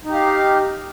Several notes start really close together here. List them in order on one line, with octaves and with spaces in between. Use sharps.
D#4 G4 F5